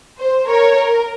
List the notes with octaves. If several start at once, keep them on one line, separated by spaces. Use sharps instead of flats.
C5
A#4 C#5
A#4